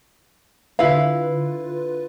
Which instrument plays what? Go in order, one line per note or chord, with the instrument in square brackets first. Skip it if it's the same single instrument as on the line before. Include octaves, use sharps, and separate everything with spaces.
[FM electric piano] D3 F4 B4 [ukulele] E4 F5